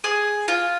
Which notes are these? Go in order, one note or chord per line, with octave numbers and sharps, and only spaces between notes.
G#4
F4